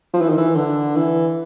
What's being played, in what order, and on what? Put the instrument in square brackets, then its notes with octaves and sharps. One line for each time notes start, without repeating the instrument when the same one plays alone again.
[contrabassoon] F3
E3
D#3
E3
D3
E3